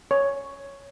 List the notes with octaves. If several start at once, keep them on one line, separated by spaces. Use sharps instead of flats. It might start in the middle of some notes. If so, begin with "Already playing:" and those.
C#5